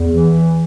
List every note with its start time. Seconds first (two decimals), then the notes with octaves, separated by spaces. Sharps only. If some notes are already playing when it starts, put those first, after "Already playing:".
Already playing: E2
0.09 E3